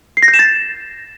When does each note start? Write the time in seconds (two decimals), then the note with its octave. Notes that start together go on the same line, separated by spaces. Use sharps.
0.17 C7
0.23 A#6
0.28 G6
0.34 E7
0.39 A6